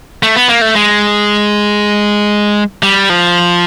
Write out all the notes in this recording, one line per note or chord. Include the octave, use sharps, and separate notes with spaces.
A3
B3
A#3
A3
G#3
G3
F3